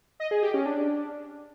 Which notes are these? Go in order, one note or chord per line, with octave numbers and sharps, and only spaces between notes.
D#5
G#4
G4
C#4
D4